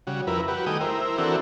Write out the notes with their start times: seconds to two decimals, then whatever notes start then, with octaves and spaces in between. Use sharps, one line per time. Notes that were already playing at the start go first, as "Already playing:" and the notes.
0.07 C#3 G3 F#4
0.27 F2 E4 A#4 B4
0.48 F#4 G4 B4
0.66 D#3 G3 A3 G#4 G5 D#6
0.80 E4 A#4 C5
1.18 E3 C4 D4 F#4 A4 A#4